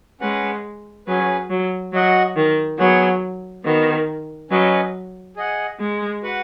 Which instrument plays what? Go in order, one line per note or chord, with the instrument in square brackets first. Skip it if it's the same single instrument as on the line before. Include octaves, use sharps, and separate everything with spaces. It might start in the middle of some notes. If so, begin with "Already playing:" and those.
[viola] G#3 [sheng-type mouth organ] C#4 B4 F#5
[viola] F#3 [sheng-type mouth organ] C#4 G#4 B4
[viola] F#3
[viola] F#3 [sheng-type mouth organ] F#4 D#5 F#5
[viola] D#3
[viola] F#3 [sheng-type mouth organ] B3 G#4 C#5 F#5
[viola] D#3 [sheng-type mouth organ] B3 F#4 D#5
[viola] F#3 [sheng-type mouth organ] C#4 B4 D#5
[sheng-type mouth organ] G#4 D#5 F#5
[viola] G#3
[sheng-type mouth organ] F#4 B4 F#5